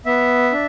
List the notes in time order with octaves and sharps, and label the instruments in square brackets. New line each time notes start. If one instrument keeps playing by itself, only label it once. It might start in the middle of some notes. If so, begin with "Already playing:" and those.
[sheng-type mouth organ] B3 E5
D4